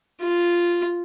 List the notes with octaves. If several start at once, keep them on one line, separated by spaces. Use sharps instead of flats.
F4